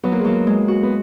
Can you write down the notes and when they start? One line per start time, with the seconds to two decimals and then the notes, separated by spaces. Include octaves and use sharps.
0.04 F#3 B3
0.12 A#3
0.20 G#3
0.25 F#3 A#3
0.47 G#3
0.68 F#4
0.83 B3